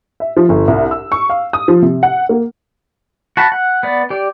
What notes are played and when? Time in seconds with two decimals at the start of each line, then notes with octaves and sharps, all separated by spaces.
0.20 E5
0.37 F3
0.49 G1
0.68 C2
0.91 E6
1.12 C#6
1.30 F5
1.53 D#6
1.68 F3
1.82 C3
2.03 F#5
2.29 A#3
3.37 F#4 A5 B5
3.52 F#5
3.83 B3 D5
4.10 G4 D5